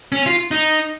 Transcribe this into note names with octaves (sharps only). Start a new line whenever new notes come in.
C#4
F4
D#4